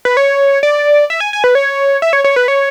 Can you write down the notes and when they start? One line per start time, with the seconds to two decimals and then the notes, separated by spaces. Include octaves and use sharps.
0.05 B4
0.17 C#5
0.63 D5
1.10 E5
1.20 G#5
1.33 G#5
1.44 B4
1.55 C#5
2.02 E5
2.13 C#5
2.24 C#5
2.36 B4
2.48 C#5